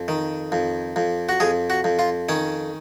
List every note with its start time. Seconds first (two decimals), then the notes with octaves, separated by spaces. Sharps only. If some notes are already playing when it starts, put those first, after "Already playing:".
Already playing: F2
0.08 D#3
0.52 F2
0.96 F2
1.29 F#4
1.40 F2 G#4
1.70 F#4
1.84 F2
1.99 F4
2.29 D#3 C#4